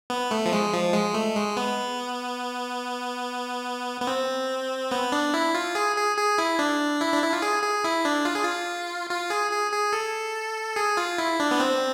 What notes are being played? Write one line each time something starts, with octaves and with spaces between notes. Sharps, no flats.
B3
A3
F3
G#3
F3
G#3
A3
G#3
B3
B3
C4
B3
D4
E4
F4
G#4
G#4
G#4
E4
D4
E4
D4
E4
F4
G#4
G#4
E4
D4
F4
G#4
F4
F4
G#4
G#4
G#4
A4
G#4
F4
E4
D4
B3
C4